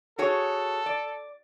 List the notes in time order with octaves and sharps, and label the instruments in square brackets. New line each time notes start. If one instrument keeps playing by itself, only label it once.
[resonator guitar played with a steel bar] F#4 G#4 C#5 [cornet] A4
[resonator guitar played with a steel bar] D5